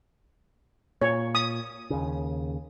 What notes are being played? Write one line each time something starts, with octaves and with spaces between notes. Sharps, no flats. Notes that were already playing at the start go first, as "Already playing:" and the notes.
A#2 C#5
D#6
D#2 C#3